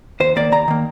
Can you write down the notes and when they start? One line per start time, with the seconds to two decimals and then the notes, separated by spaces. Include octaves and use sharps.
0.20 D#2 C5
0.36 D#3 A#3 D5
0.52 D#2 A#5
0.68 D#3 A#3